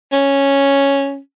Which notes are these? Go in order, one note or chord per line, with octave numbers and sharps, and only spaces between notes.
C#4